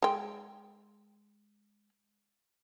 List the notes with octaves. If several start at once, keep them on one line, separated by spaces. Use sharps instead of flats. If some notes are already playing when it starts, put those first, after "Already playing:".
G#3 G5